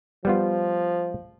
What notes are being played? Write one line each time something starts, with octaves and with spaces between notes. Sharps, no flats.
F3 G3 B3 F4